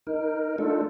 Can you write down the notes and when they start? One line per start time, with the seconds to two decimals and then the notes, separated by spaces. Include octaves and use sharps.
0.07 D#4 A#4
0.58 A3 D4 D#4 F4 A4